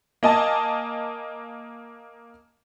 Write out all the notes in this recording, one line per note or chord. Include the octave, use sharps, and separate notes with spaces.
A#3 D#5 G#5 A5